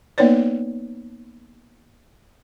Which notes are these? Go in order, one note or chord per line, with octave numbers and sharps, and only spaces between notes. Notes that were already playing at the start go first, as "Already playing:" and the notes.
A#3 B3 D#4 B4 C#5 D5